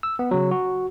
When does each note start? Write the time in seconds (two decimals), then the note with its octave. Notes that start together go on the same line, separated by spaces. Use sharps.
0.03 E6
0.19 B3
0.31 C#3 F#3
0.51 F#4